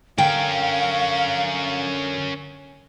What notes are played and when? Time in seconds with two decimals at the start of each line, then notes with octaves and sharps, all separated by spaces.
0.18 D3 C#4 A#4 F5 G5